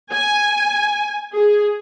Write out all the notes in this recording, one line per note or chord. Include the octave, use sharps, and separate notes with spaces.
G#5
G#4